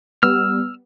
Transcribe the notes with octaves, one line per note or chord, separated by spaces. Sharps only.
G3 B3 E6 F6